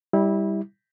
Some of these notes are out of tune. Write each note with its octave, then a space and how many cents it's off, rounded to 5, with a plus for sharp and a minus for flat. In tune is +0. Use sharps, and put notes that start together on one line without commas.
G3 +5 E4 -20